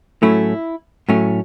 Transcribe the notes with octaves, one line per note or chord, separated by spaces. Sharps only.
A2 F#3 A3 C#4 E4
A2 F#3 A3 C#4